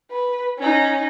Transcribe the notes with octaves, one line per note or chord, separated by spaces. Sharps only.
B4
C#4 D#4